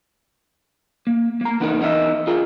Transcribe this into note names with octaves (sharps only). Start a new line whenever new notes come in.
A#3
A#3 A#5
E2 B3 D4 D#4 A#4
E2 D#4 A#4 D#5 E5
F4 G#4 A#4